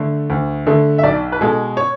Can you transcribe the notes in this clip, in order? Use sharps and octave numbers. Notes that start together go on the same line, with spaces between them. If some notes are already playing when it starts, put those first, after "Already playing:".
Already playing: D3 A3
D2
D3 A3
E5
B1 D5
B4
B2 G#3 A4
C#5